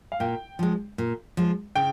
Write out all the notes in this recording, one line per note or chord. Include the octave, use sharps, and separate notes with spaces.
F5
A#2 G5
F3 G#3
A#2
F3 G#3
C#3 G5